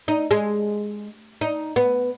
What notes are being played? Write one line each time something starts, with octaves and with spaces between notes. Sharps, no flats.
D#4
G#3
D#4
B3